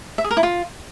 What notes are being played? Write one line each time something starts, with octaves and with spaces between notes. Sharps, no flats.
E5
G#4
A#4
E4
F4